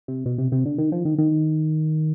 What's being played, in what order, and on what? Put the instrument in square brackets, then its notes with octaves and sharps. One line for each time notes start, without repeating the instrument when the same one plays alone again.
[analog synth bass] C3
B2
C3
C3
D3
D#3
F3
D#3
D#3